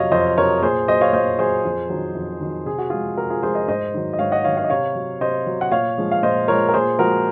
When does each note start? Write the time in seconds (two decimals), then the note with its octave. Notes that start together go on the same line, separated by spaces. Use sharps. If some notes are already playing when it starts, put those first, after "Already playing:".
Already playing: F2 C3 F#3 C#5 D#5 F5
0.11 F2 C5 D#5
0.37 C3 F#3 A#4 C#5
0.62 A#2 G#4 C5
0.88 F#3 C5 D#5
1.01 C#5 F5
1.13 A#2 C5 D#5
1.38 F#3 G#4 C5
1.65 F2
1.90 D#3 F#3
2.15 F2
2.41 D#3 F#3
2.66 C3 G#4
2.78 F#4
2.90 F3 G#3 F4 G#4
3.17 C3 F#4 A#4
3.30 F4 G#4
3.43 F3 G#3 G#4 C5
3.55 C5 D#5
3.68 G#2 C5 D#5
3.94 D#3 F#3
4.13 D#5
4.19 G#2 C#5 F5
4.32 D#5 F#5
4.44 D#3 F#3 C#5 F5
4.57 C#5 F5
4.64 D#5
4.69 C3 C#5 F5
4.95 F#3
5.21 C3 C5 D#5
5.46 F#3
5.61 F#5
5.71 A#2 C#5 F5
5.98 F3 G#3
6.11 F5
6.23 A#2 C5 D#5
6.48 F3 G#3 A#4 C#5
6.69 A#4
6.73 A#2 G#4 C5
6.99 F3 G#3 F#4 A#4